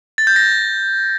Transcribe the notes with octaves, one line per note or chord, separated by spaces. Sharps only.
A6
G6
A#6